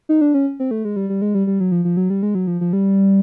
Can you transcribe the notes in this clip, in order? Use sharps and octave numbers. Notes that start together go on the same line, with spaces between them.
D#4
D4
C#4
C4
A3
G#3
G3
G3
G#3
G3
G3
F#3
F3
F3
F#3
G3
G#3
F#3
F3
F3
G3